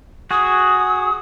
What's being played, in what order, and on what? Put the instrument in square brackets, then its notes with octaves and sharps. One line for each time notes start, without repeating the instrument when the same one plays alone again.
[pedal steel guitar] F#4 G#4 [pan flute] D#6